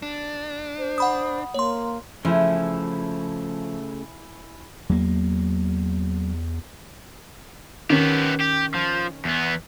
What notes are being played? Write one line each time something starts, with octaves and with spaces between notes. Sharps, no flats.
D4
C5
F#5 B5 D#6
A#3 C#5 C6
C#3 F3 A3 E4 G#5
E2 F#3 A#3
D#3 B3 C#4 G4 B6
G4
F3
E2 B3